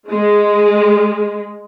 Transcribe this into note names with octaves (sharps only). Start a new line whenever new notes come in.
G#3